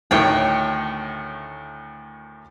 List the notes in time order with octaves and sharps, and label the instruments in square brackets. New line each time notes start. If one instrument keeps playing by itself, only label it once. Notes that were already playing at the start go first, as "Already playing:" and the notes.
[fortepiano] D2 A2 D#3 [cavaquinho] C#5 G5